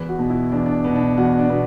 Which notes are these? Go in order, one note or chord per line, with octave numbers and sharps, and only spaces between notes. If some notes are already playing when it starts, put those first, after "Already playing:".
Already playing: E2 B4
F#4
B2 B3
E4
E2 D4
D4
B2 B3
D4
E2 F#4
D4
B2 B3